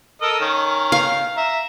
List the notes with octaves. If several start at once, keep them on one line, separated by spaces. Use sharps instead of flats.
A4 A#4 D#5
D#3 C#4
F5
E5 A#5